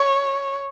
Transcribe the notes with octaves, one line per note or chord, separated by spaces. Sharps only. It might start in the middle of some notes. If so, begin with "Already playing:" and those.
Already playing: C#5